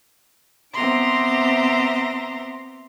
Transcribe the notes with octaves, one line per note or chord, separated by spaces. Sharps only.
B3 C4 E5 A#5 C6 D6